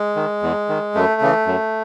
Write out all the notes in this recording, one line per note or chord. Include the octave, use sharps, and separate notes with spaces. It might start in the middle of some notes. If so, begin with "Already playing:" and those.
Already playing: G#3
D#3
E2
D#3
F#2 A3
C#3 E3
F#2